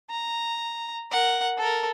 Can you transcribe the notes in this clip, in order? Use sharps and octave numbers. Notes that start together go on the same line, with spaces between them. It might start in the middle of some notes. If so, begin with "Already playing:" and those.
A#5
A#4 F#5
A4 A#4